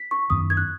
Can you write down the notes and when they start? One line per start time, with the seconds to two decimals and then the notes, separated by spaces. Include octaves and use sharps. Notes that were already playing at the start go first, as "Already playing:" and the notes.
Already playing: B6
0.11 C#6
0.30 F#2 D#3 B3 D#6
0.50 G#6
0.57 F#6